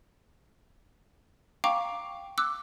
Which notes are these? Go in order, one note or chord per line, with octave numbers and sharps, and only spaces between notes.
F5 G5 A#5 C#6 D6
D6 E6 F#6